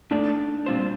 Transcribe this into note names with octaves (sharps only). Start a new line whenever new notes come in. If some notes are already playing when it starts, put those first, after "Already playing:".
A3 D4 D#4 A4 D5
A#2 G3 C4 F4 C5